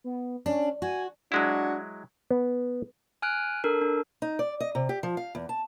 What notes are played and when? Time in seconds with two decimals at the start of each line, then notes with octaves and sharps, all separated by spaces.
0.04 B3
0.46 C#4 D4
0.82 F#4 G#5
1.32 F#3 G#3 D4 E4 F#4
2.31 B3
3.22 G#5 F6 F#6 D7
3.64 D4 A4 A#4
3.81 D4
4.22 D#4
4.39 D5
4.60 D#5
4.75 C3
4.89 G4
5.03 F3
5.17 F5
5.35 E2
5.49 A5